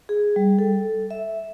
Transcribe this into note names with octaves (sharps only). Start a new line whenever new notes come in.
G#4
G3
A4
E5